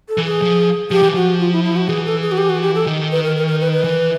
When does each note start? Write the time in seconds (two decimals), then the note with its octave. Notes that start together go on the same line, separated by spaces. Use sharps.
0.09 A4
0.18 E3
0.25 G#4
0.42 F3
0.91 F3 G4
1.03 E3
1.14 F3 F#4
1.40 F4
1.53 E4
1.64 E4
1.76 F#4
1.88 E3 G#4
2.06 A4
2.22 G#4
2.32 F#4
2.38 G4
2.49 F#4
2.62 G4
2.75 A4
2.87 D#3
3.12 B4
3.24 A#4
3.36 A#4
3.47 A#4
3.60 B4
3.73 B4
3.84 E3